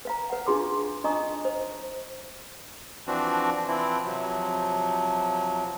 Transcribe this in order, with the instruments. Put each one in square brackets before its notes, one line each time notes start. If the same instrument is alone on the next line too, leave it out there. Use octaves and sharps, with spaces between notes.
[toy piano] B4 F5 A#5
B4 F#5
D4 D#4 F4 G#4 C6 D6
D4 D#4 D#5 A#5 C#6 D#6
C5
[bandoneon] E3 F3 C4 D4 F#4
E3 F3 C4 E4
C3 F3 F#3